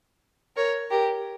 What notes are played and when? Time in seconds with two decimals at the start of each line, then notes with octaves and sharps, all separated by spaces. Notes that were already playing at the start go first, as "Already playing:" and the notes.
0.56 A#4 C#5
0.91 G4 A#4